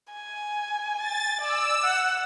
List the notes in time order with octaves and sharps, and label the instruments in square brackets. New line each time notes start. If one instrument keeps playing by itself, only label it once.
[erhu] G#5
[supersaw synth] A6
[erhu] D5 [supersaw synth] E6
[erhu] F#5